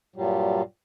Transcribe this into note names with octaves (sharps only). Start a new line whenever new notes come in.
G2 A#2 F#3 G3